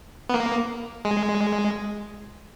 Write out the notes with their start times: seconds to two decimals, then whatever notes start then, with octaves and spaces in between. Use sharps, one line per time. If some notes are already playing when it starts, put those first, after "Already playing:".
0.29 B3
0.34 A#3
1.05 G#3